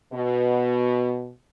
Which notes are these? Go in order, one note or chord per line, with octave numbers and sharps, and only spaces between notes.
B2